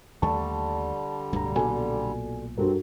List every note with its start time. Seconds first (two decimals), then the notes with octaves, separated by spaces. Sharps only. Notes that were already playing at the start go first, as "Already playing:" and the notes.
0.22 D#2 D3 G3 A3 A5 C#6
1.33 D1 C#2 G2 B2 A#5
1.56 B1 A#2 B3 F#4 A4 D5 G#5
2.58 G2 C4 F#4 A4 A#4